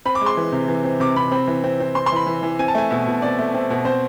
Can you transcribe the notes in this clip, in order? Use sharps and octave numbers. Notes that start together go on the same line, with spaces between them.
C4 B5
D6
G#3
C6
E3
C3
E3
C4
C3 D6
C3 B5
C4 B5
E3
C4
C4
C4 C6
C6
E3 B5
E3
E3
C4 G#5
A5
A3 G#5
B2 E5
B2
C4 D5
A3
C4
B2
C4 C5